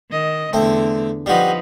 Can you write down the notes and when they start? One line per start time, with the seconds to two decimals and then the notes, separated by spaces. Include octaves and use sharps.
0.11 D#3 D#5
0.53 E2 D3 A3 C4
1.26 F3 G3 D#4 F#4 B4